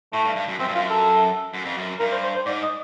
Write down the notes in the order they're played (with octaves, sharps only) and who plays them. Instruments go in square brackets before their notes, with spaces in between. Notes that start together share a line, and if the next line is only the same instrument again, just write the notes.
[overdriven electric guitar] A2 [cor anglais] A3
[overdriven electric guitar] G2
G2
F#2
[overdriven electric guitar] F#2 [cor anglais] C4
[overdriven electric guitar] G2
[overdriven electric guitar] F#2 [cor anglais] F4
[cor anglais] A4
[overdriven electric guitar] F#2
F2
F#2
[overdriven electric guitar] G2 [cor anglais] A#4
[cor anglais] C5
C5
C5
[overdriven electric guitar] G#2 [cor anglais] D5
[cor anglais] D#5